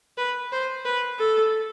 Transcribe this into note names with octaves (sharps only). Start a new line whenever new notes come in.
B4
C5
B4
A4